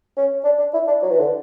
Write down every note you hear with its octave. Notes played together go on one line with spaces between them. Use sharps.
C#4
D4
D4
E4
D4
F#3
E3
D3